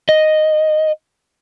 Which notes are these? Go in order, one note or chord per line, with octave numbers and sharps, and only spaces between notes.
D#5